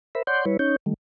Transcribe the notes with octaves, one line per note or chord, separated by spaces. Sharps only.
A#4 C5 E5 B5
C#5 D5 F#5 C6 G6
G3 E4 B4 C#5
C#4 D#4 C#5 G6
D#3 G3 A3